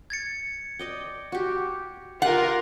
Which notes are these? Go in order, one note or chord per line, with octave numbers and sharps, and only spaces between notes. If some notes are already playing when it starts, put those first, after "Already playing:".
G#6 A6 C#7
D5 D#5 G5
F#4 G4
F4 G4 A#4 F#5